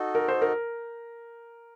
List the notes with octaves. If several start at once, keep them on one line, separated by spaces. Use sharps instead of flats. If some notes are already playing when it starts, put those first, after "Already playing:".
Already playing: D#4 F#4 A4 D#5
A#4
C5
A#4